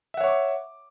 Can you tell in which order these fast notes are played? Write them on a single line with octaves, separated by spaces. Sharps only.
E5 F#5 C#5 C#6 D6